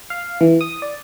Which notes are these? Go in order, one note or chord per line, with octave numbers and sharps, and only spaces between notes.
F5
E3
D#6
D5